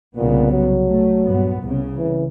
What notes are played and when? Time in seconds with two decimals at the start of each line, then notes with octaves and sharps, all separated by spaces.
0.16 C2 A#2 C#3 B3
0.52 F#3
0.88 A3
1.27 G2 A#2 B3
1.61 C2 C#3
1.97 E3